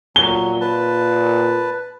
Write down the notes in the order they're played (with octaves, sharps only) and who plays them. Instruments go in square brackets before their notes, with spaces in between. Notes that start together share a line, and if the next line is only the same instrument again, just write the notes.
[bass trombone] A#2 [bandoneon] F#3 [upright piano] G7
[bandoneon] B4 A5